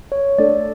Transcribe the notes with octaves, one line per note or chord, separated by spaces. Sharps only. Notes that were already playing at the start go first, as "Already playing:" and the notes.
C#5
A3 D4 A4 D5